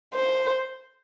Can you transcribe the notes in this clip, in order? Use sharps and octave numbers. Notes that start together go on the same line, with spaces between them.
C5